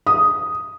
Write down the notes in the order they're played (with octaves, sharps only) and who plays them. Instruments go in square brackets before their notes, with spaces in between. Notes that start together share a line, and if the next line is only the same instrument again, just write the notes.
[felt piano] D#6